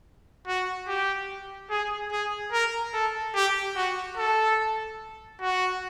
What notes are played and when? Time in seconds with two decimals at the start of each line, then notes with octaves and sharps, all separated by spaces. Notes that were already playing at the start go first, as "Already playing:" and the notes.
0.47 F#4
0.88 G4
1.70 G#4
2.11 G#4
2.52 A#4
2.93 A4
3.35 G4
3.76 F#4
4.17 A4
5.41 F#4